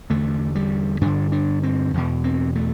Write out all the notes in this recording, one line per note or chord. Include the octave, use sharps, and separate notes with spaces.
E2 D3 A3
G3
G2 D3 D4
D4
C4
E2 B2
C4
A3